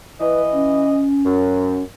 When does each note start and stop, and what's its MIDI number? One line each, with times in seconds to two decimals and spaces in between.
0.20 1.03 52
0.20 0.42 71
0.20 1.03 75
0.53 1.83 61
1.25 1.81 42